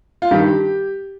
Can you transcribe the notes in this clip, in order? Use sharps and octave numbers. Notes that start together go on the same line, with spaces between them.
F4
G2 D#3 G4